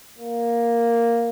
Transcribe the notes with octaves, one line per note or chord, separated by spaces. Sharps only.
A#3